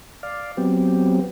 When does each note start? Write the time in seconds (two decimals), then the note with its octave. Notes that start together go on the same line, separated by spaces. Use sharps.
0.23 D5 F5
0.57 F#3 B3 C4 G4